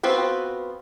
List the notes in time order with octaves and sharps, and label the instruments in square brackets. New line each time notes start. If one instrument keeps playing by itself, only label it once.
[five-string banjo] B3 C4 F4 F#4 B4